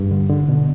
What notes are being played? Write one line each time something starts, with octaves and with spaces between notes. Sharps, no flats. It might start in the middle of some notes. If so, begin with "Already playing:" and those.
Already playing: G2
D3
D3
B2